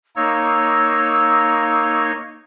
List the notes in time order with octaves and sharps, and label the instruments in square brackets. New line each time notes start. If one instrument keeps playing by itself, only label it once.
[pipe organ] A#3 D#4 C#5 [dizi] E6